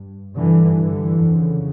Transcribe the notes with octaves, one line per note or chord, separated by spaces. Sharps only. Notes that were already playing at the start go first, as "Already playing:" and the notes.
Already playing: G2
G2 D3 E3
D3 E3
F2 C#3